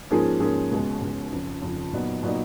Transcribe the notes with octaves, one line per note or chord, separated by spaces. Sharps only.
G#2 F3 A#3 C#4 G#4
G#2 F3 A#3 C#4 G#4
C#2 B2 G#3 C#4
C#2 B2 G#3 C#4
F2 C#3 F3
F2 C#3 F3
A#2 F#3 B3 D#4
A#2 F#3 B3 D#4